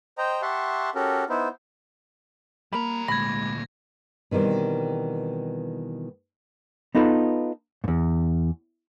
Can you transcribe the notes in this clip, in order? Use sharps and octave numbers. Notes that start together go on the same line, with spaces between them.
C5 D#5 G5 A#5
G4 E5 F#5 A5 C6 C#6
C#4 F#4 G4 A4 A#4
B3 D#4 E4 C5
G3 A#3 A#4 A#5 B5
D2 A#2 G#3 B5 G#6 A#6
B2 D#3 E3 G3 C4
B3 D#4 F4 A4 B4
E2 G#2